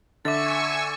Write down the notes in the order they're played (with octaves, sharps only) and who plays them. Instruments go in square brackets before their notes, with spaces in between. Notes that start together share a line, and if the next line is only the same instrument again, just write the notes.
[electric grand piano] D3 [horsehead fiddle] E5 [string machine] G#5 C#6 E6 [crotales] D6 A6